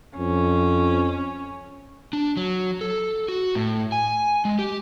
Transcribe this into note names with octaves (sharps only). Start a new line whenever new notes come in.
F2 C#4
D4
F#3
A4
F#4
A2
G#5
G#3
G4